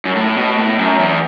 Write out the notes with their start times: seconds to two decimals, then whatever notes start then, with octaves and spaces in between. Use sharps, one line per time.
0.05 F#2
0.15 A2
0.37 B2
0.57 A2
0.79 F#2
0.99 E2